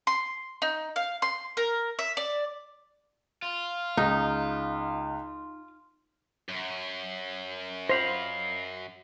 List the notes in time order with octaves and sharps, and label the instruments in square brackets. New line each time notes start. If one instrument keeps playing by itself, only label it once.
[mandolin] C6
D#4
F5
C6
A#4
E5
D5
[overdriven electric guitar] F4
[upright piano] C#2 [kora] D#4
[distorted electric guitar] F#2
[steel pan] C5 [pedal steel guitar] D#5 F5 B5